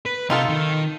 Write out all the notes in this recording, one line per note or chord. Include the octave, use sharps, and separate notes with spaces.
B4
C3 D#4 F4 A4
D#3